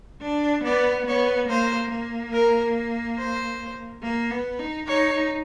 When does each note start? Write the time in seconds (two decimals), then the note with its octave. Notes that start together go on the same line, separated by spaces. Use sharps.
0.22 D4
0.64 B3 D5
1.07 B3 C#5
1.49 A#3 C5
1.91 A#3
2.33 A#4
3.18 C5
4.02 A#3
4.30 B3
4.59 D#4
4.87 D#4 C#5